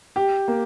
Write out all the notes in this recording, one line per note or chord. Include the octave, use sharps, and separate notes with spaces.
G4
A#3